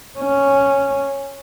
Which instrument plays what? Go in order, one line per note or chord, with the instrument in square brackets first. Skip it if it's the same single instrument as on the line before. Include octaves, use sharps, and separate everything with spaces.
[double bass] C#4